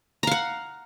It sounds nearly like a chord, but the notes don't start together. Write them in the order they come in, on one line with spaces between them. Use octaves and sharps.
A#5 F5 F#5